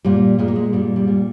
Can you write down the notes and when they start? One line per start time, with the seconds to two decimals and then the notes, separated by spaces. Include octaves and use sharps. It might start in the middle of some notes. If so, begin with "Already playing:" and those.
0.05 A#2 G3
0.39 A#2 G#3
0.48 A#3
0.56 G#3
0.73 A#2 G3
0.96 G3
1.07 A#2